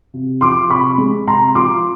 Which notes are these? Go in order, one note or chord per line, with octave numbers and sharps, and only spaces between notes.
C3
F3 C6 D6
C3 B5 C#6
G#3
C3 A#5 C6
F3 C6 D6